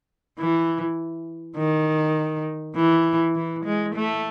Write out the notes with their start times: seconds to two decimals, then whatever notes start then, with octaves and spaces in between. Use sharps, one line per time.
0.39 E3
1.57 D#3
2.76 E3
3.36 E3
3.65 G#3
3.95 A3